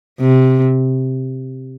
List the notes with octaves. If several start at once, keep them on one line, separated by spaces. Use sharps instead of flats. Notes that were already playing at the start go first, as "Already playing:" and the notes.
C3